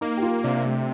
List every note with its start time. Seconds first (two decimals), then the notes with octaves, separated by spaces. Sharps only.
0.01 A#3 D#4
0.17 G4
0.22 F4
0.43 C3 D4
0.65 A3